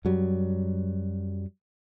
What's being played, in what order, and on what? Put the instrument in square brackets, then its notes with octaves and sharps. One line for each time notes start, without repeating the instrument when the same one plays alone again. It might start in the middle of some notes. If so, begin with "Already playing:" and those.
[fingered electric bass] F#2 F#3 G3